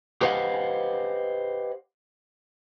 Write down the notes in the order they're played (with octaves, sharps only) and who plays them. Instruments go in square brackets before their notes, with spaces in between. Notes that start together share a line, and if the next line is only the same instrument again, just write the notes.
[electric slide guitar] G4 B4 C5 D#5 F5 F#5